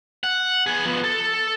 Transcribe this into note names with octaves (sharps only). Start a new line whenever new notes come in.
F#5
B3 G#4
F3 B3
A4